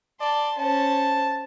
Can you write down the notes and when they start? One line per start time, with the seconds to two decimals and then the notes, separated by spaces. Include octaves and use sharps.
0.21 D5 A5 C6
0.58 C#4 C5 A5